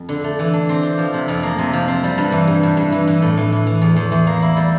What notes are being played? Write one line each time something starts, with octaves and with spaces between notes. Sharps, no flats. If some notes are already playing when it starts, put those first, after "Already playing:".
Already playing: F2
D3
A3
E3
D4
C4
G4
F3
C3
F2
A#3
C3
F3
C4
G3
G2
E3
G2
G2
G2
E3
E3
A2
E3
E3
E3
E2
E2
E2
A#3
E4
G3